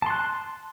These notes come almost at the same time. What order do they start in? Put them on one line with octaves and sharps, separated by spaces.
A5 C6 F#6